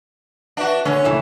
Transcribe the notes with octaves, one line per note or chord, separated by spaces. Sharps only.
D4 F#4 B4 E5 F#5
D3 C#4 C#5
C#2 E3 A3 E5